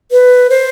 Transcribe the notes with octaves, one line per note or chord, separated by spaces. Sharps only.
B4
C5